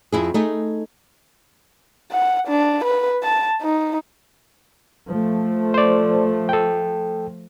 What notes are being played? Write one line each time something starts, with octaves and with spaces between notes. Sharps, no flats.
F2 E4 G#4
A3 D#4 G#4
F#5
D4
B4
A5
D#4
F3 A3
C5 D5
A4 G5